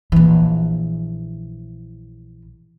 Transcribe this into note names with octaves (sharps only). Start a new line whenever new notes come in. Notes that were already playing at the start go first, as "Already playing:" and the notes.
A#1 E3